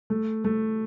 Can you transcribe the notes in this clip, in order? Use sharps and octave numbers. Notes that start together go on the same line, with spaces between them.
A3
A3